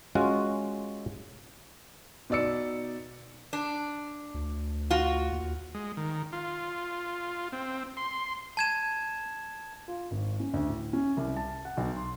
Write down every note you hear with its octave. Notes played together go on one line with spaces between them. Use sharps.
G#3 C#4 F4 F#4
B2 D#4 D5 E6 C#7
D4
D2
F4 F#4
D#2
G#3
D#3
F4
C4
C6
A5 G#6 E7
F4
G#1
C#4
D2
A2
C#4
C2
A5
F#5
B1
C6